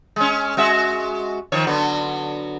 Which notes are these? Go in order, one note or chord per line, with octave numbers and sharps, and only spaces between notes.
G#3 C#4
G#3 F#4 E5
D#3 F3 C#5
D3 F#3 B3